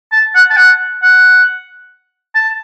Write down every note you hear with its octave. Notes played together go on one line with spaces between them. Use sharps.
A5
F#5
A5
F#5
F#5
A5